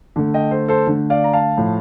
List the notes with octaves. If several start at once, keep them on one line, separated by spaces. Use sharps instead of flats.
D3 A3
D#5 G5
A4 C5
A4 C5
D3 A3
D5 F5
A#5
F5 A5
A2 F3 A3